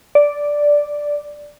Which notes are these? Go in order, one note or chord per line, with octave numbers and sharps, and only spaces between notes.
D5